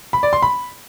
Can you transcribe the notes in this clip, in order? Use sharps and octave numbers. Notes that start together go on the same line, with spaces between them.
B5
D5
C6
B5